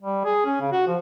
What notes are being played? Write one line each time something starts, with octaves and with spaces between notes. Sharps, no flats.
G3
G#4
C#4
C#3
F#4
F3